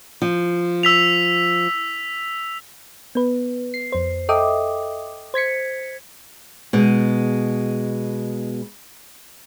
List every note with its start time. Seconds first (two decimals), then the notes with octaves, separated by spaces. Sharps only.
0.22 F3
0.83 E6 B6 F7
3.15 B3 B4
3.74 C7
3.92 F2 C5
4.29 A4 D#5 E5 G5 D6 D#6
5.34 C5 G#6 B6 C#7
6.73 B2 G#3